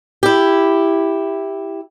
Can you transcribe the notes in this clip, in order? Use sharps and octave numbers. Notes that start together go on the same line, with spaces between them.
E4 G4